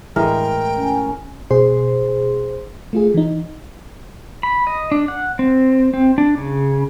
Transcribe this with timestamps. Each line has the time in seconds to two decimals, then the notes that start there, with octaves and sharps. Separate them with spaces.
0.16 A2 E3 G#3 A#4 G5
0.76 C#4
1.51 B2 G#4 C5 C6
2.93 A3 F4 G#4
3.14 E3 D#4
4.43 B5
4.67 D#5
4.92 D4
5.08 F#5
5.39 C4
5.94 C4
6.18 D4
6.37 C#3